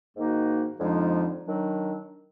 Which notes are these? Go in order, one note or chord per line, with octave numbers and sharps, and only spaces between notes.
G#2 D#3 A#3 D#4 F#4
F2 D3 F3 G#3 D#4
D#3 F#3 D4